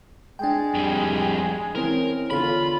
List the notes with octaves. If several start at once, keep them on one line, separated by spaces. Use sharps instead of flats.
G#3 D4 G5
F2 G3
E3 C4 C#4 A#4
E2 D3 F4 C#5 B5